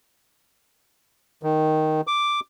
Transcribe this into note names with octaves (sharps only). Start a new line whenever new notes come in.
D#3
D6